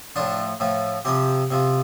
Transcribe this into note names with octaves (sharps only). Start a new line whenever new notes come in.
A2 F3 D4
A2 F3
C3 F3 G4
C3 F3